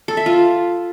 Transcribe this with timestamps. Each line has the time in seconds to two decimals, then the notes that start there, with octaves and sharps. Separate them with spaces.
0.08 A4
0.17 E5
0.26 F4